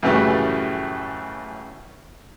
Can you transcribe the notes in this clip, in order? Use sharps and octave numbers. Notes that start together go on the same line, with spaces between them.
F#2 A2 C#3 E3 G3 A3